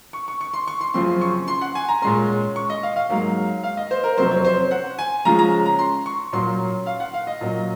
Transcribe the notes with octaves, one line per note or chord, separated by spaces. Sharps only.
C#6
C#6
C#6
C6
C#6
C6
F#2 C#3 F3 C4 C6
C#6
C6
F#5
G#5
A#5
A#2 G#3 C#4 C6
C#6
D#5
F5
F5
G#2 F#3 A#3
F5
D#5
C5
A#4
F2 C3 F#3 C#4 C5
C#5
C5
F#5
G#5
C#3 F3 G#3 C#4 A#5
A#5
A#5
C6
C#6
A#2 F#3 A#3 C#4 C6
F5
F#5
F5
D#5
A#2 F#3 C#4